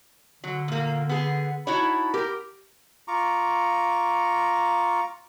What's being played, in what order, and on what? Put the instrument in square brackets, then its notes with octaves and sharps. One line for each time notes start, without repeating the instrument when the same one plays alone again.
[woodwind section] D3 [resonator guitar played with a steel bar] F#3
[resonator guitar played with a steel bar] A#2 A#3
B3 G#4
[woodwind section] D#4 A5 B5 [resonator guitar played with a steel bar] E4 F#4 C#5
[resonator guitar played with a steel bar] G4 [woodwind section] A#4
[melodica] F4 A#5 C#6 D6